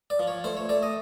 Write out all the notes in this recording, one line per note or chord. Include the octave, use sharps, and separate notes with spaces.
D5
F3
C#5
A3 C5
C#5
A3 D5
D#5